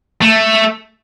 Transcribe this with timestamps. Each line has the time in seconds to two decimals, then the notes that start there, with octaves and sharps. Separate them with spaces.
0.22 A3